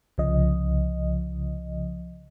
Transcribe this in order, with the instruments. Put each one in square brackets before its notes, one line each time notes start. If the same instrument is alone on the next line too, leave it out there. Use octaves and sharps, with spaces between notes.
[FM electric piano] C2 C#3 F3 D#5